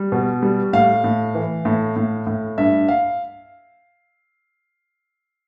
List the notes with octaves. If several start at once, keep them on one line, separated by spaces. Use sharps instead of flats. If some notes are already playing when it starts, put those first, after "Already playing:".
Already playing: G3
B2
G3
A2 F5
A2
E3
A2
A2
A2
G2 E5
F5